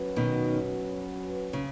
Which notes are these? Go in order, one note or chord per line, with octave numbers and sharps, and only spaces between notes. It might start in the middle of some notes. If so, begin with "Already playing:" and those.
Already playing: F#3 C#4 F#4 B4
B2 D#3
C#3